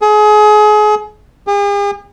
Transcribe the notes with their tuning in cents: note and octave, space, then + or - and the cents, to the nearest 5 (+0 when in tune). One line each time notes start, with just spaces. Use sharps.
G#4 +30
G#4 -45